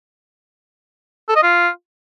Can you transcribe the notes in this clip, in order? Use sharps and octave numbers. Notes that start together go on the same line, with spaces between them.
A4
D#5
F4